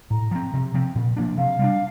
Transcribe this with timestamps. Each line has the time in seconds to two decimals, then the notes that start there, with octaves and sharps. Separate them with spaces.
0.10 A2 A#5
0.31 F3 C4
0.53 C3
0.74 F3 C4
0.95 A#2
1.17 F3 A#3 D4
1.37 C3 F5
1.59 G3 A#3 D4